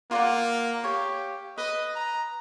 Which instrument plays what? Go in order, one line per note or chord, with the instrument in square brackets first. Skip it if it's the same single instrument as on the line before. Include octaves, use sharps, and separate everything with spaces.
[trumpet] A#3 [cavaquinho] F4 D5 F#5
[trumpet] G4 [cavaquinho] C#5 F5
[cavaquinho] B4 [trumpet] D#5
[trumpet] A#5